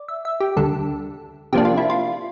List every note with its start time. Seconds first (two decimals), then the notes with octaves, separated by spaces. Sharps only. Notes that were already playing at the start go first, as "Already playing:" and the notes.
Already playing: D5
0.08 E5
0.25 E5
0.40 G4
0.56 D2 D3 G3 A4
1.53 C3 F3 A#3 D4 G4
1.65 F4
1.77 E4
1.90 F4